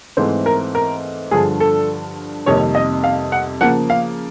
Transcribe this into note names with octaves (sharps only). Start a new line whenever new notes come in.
G#2 E3 A3 C4 C5
A#4
A#4
G2 D3 F3 G#4
A4
F2 C3 D#3 G3 A#3 C#5
D#5
F5
F#5
C#3 F3 A#3 F#5
F5